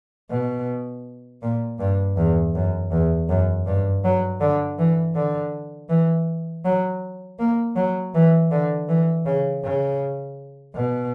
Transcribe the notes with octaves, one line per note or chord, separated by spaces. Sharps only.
B2
A#2
G2
E2
F#2
E2
F#2
G2
F#3
D3
E3
D3
E3
F#3
A#3
F#3
E3
D3
E3
C#3
C#3
B2